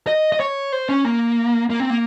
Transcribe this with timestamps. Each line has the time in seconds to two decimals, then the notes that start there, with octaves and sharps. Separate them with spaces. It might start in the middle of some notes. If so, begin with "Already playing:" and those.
0.07 D#5
0.32 D#5
0.40 C#5
0.72 C5
0.89 C#4
1.05 A#3
1.70 A#3
1.80 C4
1.90 A#3